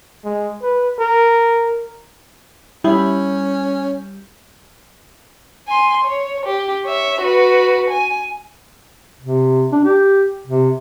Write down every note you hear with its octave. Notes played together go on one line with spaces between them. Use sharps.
G#3
B4
A#4
G3 C#4 E4
G#5 C6
C#5
G4
C#5 E5
F#4 B4
G#5
C3
D4
G4
C3